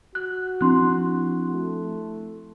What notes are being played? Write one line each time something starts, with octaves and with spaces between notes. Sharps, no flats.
F#4 F#6
F3 C4 D4 E4 C6 F#6
A3